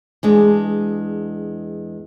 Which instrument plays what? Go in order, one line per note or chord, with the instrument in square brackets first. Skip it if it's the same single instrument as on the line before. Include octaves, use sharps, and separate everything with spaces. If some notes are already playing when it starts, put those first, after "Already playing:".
[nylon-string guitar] E2 G#3 D4